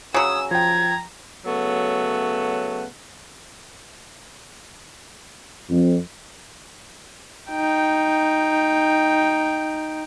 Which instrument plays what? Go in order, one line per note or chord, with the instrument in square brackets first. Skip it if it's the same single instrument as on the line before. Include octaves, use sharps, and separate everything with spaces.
[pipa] C#3 F#3 [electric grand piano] G#5 [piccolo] D#6 [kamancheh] E6
[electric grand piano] F3 G5 [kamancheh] A#5 [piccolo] G#6
[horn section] C#3 F#3 A3 B3
[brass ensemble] F2
[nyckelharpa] D#4 G5